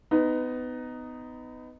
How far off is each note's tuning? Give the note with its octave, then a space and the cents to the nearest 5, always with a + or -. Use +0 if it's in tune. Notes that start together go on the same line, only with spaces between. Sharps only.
B3 +25 D#4 +0